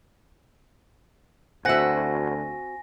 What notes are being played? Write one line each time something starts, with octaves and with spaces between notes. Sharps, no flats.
D2 C4 F#4 E5 F#5 G#5 A#6